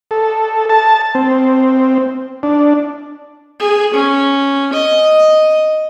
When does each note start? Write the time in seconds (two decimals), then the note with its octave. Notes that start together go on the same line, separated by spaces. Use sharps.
0.11 A4
0.69 A5
1.15 C4
2.43 D4
3.60 G#4
3.94 C#4
4.73 D#5